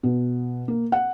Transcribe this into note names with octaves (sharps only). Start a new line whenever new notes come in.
B2
A#3
F#5